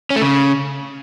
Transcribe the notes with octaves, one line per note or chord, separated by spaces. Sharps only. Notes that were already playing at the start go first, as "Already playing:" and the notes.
C#4
A3
C#3